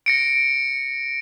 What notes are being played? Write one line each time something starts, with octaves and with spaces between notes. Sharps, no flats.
A#6 C#7 D7